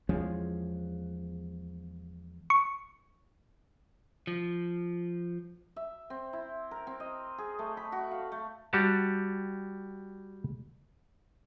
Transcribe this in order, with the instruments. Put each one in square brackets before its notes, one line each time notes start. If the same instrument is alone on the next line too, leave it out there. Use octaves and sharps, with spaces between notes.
[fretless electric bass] E2 F3 G#3 C#4
[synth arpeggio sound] C#6
[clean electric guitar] F3
[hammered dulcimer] E5
C4
E4
A#4
C4
D#5
G#4
A3
B5
F#4
F5
A3
[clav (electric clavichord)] G3 F#4 G4 A5